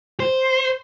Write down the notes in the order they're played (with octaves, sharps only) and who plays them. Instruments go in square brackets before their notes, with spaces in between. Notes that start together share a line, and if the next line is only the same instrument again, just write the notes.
[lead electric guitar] C5